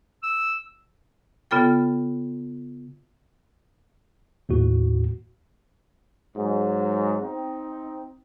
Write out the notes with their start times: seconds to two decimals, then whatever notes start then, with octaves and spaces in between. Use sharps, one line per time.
0.23 E6
1.51 C#3 B3 F4 A4 G5
4.49 D#2 A2 F#4
6.36 G#2 F#3
7.22 C4 D#4